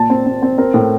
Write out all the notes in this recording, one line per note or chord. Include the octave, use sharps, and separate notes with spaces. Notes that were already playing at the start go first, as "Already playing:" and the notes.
Already playing: A#2 A5
C4
C4
C4
C4 A#4
A2